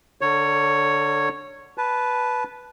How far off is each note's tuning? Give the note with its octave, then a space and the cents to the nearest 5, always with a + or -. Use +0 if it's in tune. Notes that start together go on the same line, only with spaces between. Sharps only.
D3 +0 A#4 -45 C#5 +0
B4 +0 A5 -20